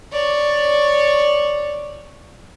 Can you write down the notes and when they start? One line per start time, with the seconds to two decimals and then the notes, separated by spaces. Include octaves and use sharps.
0.13 C#5 D5